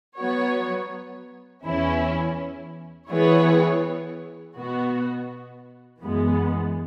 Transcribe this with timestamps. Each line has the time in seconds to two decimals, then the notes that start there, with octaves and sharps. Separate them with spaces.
0.17 F#3 B3 F#4 C#5
1.64 E2 E3 C#4 E4
3.10 E3 B3 E4 G#4 C#5
4.57 B2 B3 F#4
6.02 F#2 E3 G#3 B3